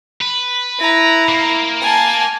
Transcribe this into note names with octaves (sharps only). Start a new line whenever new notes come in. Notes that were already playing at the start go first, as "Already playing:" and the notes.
B4
E4 A#5
A#3
G#5 A5